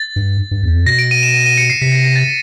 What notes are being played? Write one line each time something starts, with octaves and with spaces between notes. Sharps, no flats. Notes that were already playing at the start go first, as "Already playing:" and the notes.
Already playing: A6
G2
G2
E2
F2
B2 A#6
D7
D#7
E7
D#7
D#7
C#7
C7
C3 B6
A#6
A#6
A6